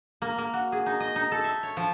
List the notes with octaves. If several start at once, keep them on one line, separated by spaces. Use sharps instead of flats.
A#3
A#3
F#4
G#4
D#4
D#5
D#4
A4
E5
C#5
F3